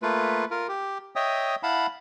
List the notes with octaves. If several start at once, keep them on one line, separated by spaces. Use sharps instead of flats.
A3 A#3 F4 B4
F4 A#4
G4
C#5 D#5 E5 G5 D#6
E4 F5 F#5 A5 B5